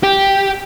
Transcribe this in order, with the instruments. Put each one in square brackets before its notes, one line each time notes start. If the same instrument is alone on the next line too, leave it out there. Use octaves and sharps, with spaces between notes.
[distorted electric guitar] G4